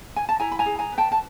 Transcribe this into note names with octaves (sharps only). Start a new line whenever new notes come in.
G#5
A5
E4 G#5 A#5
B5
G#5 A#5
G#4
G#5 A#5
B4
G5 A5
A5